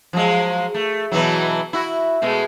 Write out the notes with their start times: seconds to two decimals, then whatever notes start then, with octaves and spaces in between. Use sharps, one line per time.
0.13 F3 F#3 G#3
0.75 A3
1.12 B2 E3 F#3
1.73 E4 F#4
2.22 B2 G#3 A3